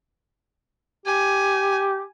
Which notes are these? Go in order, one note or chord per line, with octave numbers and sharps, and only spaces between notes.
G4 G#5